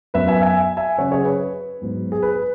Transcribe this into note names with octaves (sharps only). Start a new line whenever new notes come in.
F#2 F#3 B3 B4 E5
E5 G#5
E5 G#5
E5 G#5
C#3 F#3 C#4 C#5 F#5
G#4 C#5
B4
G#2 F#3 B3
G#4
B4